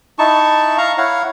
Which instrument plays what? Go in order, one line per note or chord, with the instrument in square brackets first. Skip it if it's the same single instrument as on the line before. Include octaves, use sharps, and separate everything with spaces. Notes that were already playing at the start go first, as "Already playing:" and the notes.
[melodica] D#4 E4 A5 C#6
F5 A#5 C#6
E4 C#5 F5 F#5